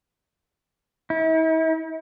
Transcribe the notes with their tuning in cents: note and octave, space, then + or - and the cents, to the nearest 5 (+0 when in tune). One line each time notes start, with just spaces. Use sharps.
E4 -45